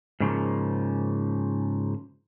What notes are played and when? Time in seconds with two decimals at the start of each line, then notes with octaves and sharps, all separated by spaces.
0.20 G#2 C#3 F3 A#3